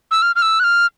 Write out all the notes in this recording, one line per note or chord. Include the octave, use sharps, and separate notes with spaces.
E6
F6
F6
E6
F#6
F6